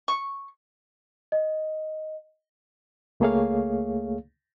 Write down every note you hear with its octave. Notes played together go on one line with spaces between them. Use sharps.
C#6
D#5
C#2 A3 A#3 G#4 C#5 F5